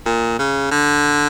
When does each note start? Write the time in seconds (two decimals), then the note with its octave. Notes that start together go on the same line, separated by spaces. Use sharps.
0.05 A#2
0.39 C#3
0.71 D3